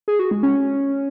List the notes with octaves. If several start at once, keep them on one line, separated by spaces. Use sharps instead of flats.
G#4
F#4
G#3
C#4